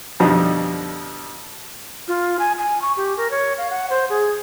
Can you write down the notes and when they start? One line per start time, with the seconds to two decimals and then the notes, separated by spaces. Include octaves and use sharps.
0.20 F2 B2 D3 F3 G3 D#4
2.08 F4
2.39 G#5
2.58 G#5
2.82 C#6
2.97 G4
3.17 A#4
3.31 C#5
3.58 F5
3.70 F#5
3.90 C5
4.10 G#4